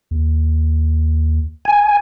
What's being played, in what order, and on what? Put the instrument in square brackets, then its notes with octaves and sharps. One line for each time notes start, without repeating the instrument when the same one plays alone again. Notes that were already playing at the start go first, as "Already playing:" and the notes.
[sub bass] D#2
[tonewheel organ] G#5